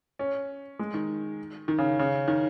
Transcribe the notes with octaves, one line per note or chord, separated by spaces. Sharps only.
C#4
G#3
D#3
D#3
C#3
C#3
D#3